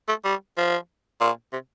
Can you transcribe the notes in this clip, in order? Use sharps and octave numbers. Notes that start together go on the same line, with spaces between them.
A3
G3
F3
A#2
C3